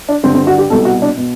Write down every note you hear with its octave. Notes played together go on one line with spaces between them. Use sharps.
D4
G2 D3 C4
C4
F#4
G4
C2 B2 A4
F#4
D4
B2